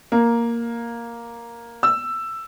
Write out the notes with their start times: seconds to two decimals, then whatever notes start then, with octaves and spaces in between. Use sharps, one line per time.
0.12 A#3
1.83 E6